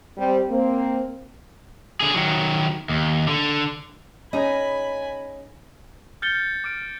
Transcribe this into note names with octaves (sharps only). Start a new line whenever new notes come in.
G3 C4
A#3 C4
D3 G#4
D#3 F#3
D#2
D3
C#4 D#4 G#4 D#5 G#5 B5
F6 G6 A6 C#7 G7
D6 F6 D7